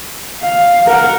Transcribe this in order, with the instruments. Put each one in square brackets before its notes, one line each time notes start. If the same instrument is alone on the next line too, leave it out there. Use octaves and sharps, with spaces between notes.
[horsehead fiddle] F5
A#4 F#5